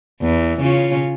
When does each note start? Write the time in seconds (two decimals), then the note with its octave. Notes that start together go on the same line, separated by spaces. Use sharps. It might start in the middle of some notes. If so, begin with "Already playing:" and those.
0.22 E2
0.60 C#3 C#4 F4